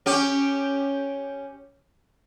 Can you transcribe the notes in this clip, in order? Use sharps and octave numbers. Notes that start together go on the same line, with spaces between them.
C#4 G4